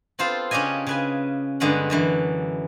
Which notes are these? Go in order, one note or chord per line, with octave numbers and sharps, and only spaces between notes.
B3 C4 F4 A4 C5
C#3 C#4 D4 G4 D#5 G#5
C#3 B4 G#5
G2 D3 G#3 B3 B4 F#5
F#2 D3 E3